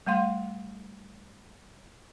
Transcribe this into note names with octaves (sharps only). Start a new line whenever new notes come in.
G3 A3 F5 C6